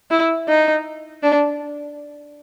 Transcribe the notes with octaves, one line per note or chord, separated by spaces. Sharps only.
E4
D#4
D4